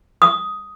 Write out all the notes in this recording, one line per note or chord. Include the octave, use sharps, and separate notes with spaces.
D#6